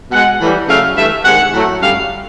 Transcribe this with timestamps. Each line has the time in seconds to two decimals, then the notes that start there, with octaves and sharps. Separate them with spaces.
0.11 B2 G#3 F#5
0.40 A2 E3 G3
0.68 C#3 F#3 A3 F5
0.96 G2 E3 A3 E5
1.25 C3 D#3 G#3 F#5
1.53 A2 F#3 A3
1.81 F#2 D3 G3 F5